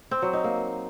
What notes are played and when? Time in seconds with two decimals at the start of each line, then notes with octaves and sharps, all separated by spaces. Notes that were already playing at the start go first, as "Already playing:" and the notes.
0.11 C4
0.22 F#3
0.33 D#4
0.44 A#3